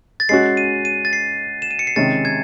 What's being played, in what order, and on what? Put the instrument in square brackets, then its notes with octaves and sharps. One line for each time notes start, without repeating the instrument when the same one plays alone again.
[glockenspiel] A6
[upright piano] G#3 C#4 F#4 [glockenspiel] C7
[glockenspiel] D#7
D#7
A6
C7
E7
D#7
C#7
C7
[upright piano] C3 D#3 G#3 C#4 [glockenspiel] A6
[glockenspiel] G#6